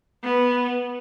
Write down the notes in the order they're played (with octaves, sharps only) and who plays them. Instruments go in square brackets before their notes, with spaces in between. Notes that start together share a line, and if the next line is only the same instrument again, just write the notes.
[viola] B3